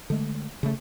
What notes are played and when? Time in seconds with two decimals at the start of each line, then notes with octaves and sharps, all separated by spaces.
0.10 D3 G#3 A3
0.63 C#3 A3